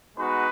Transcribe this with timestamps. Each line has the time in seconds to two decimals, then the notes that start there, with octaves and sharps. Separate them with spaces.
0.17 G#3 B3 D#4 F#4 B4